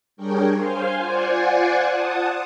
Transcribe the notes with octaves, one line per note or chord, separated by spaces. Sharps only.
G3 D4 G#4 A#4 C#5 G5
C5 F5 G#5 C6
F4 C5 D5 F#5 G#5
F#5 A5 D#6